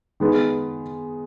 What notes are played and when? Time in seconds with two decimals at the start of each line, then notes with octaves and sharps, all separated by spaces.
0.20 D#3 G#3 B3